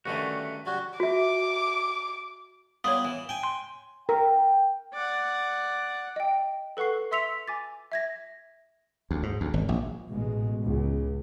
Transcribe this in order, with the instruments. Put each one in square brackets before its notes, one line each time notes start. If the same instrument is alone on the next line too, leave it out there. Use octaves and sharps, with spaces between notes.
[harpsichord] G2 D3 D#3 [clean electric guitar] A3 C#4 F#4
[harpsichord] F#3 G3 C#4 [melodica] F#4
[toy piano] F#4 E5 [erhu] D6
[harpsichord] G3 B3 F4 [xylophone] C#5 D#6
[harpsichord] E3
G5 G#5
[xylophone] C6
[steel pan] A#4 [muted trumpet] G5
[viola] D5 F#5
[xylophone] D#5 G5
A4 B4 F#5 C#6 C7
E5 C6 E6 B6 C#7 F7
G#5 D6 A6
E5 G#6 A#6
[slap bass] D2
G#2
D2
G#1
A#1
[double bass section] A1 B2 G#3
C#2